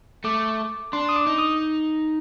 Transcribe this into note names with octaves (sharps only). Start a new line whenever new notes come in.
A3 D6
D4 C6
D#6
D6
D#4
D#6